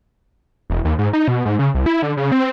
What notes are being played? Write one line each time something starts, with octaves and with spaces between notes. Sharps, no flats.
E1
D#2
G#2
D#4
B2
G#2
C#3
C2
E4
D3
C#3
C4